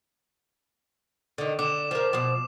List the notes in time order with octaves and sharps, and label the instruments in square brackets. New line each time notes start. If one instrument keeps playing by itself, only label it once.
[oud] D3 D#3
[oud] D3 [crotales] D6 E7
[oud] F3 A#4
B2 F3